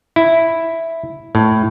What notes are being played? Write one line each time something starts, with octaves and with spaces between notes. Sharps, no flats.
E4
A2